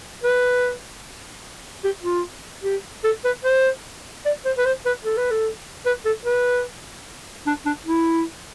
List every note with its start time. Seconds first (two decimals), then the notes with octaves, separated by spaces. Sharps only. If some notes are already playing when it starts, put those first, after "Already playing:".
0.23 B4
1.84 G4
2.03 F4
2.64 G4
3.04 A4
3.25 B4
3.44 C5
4.25 D5
4.45 C5
4.58 B4
4.65 C5
4.85 B4
5.04 A4
5.17 B4
5.31 A4
5.86 B4
6.05 A4
6.25 B4
7.47 D4
7.66 D4
7.86 E4